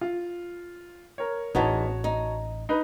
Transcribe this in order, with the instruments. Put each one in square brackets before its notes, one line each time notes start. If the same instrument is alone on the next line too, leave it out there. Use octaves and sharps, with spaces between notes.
[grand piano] F4
A#4 C#5
[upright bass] A1 [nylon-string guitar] E2 B3 D#4 [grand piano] F#4 C#5 A5
[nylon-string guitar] D#4
[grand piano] D#4 B4